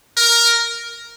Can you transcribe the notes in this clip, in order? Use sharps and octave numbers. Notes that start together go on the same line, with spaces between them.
A#4